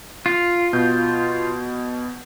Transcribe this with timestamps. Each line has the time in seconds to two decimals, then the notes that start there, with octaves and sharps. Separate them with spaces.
0.26 F4
0.73 B2 G6